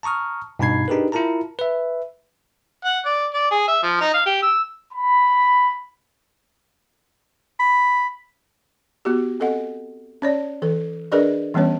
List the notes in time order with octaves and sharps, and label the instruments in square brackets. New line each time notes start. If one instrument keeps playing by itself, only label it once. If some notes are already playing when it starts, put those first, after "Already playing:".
[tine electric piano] A5 A#5 C#6 D#6 F6
G2 B2 D#4 B5 G#6 C7
D4 D#4 G4 G#4 A#4 B4
E4 F4 A#4 A5 A#5
B4 E5
[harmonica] F#5
D5
D5
G#4
E5
F3
D#4
F5
G4
E6
[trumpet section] B5
[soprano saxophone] B5
[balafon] B3 F#4 G4
C4 A4 D#5 F#5
C#4 C#5 D5
E3 A4
D4 G#4 A#4 B4 D5 D#5
E3 G3 B3 C#4 C#5